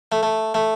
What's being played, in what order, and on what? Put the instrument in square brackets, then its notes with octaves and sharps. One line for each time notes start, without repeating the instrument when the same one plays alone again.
[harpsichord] A3
A3
A3